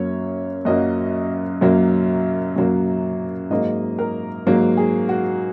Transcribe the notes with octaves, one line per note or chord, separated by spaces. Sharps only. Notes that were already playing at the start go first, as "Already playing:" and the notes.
Already playing: F#2 F#3 A#3 C#5
F#2 F#3 A#3 D#5
F#2 F#3 A#3
F#2 F#3 A#3
G#2 F#3 A#3 D#5
A#4
G#2 F#3 A#3
G#4
F#4